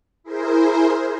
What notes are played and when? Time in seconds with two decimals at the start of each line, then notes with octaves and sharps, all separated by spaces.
0.23 E4 G#4 A#4 C5